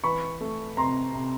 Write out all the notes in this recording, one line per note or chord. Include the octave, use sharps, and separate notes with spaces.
E3 B5 C#6
A3
C3 A#5 C6
C3